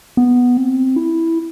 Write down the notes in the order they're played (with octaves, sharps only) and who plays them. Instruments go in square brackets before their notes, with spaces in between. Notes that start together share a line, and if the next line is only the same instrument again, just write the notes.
[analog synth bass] B3
C4
E4